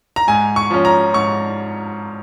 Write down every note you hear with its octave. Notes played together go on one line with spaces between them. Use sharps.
A#5
G#2 G#5
C#6
F3 C#4
A#5
G#2 C#6